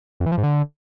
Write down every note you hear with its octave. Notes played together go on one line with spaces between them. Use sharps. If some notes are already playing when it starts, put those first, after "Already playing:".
F2
E3
F3
G#2
D3